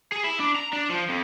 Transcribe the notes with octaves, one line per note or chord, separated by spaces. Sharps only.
G#4
E4
D4
A#5
D4
F3
F2